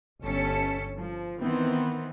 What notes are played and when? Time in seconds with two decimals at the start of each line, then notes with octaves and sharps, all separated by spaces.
0.24 G1 C#4 A4 B6 C#7
0.95 F3
1.39 D#3 E3 B3 C4